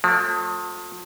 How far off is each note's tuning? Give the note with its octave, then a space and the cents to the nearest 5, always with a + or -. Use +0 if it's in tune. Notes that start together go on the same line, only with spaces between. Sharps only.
F3 +40 A3 +15